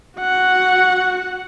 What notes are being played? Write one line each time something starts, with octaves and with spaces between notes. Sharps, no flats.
F#4 F#5